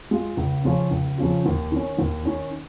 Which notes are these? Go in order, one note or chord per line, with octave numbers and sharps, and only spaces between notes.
G#3 F4
C#2
C#3 F3 C#4 F4
C#2
C#3 F3 C#4 F4
D#2
D#3 C#4
D#2
D#3 C#4